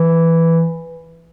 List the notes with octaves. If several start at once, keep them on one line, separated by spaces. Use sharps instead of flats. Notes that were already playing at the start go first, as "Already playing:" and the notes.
Already playing: E3